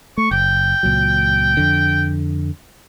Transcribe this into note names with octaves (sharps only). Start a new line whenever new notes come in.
A3 C#6
F#1 G5
C#2 A#2 F#3
F2 D3